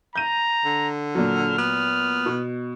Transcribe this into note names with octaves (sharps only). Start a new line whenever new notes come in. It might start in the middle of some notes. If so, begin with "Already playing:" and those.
A#5 G6 D#7
D3
A#2 F#3 F6
B3
B2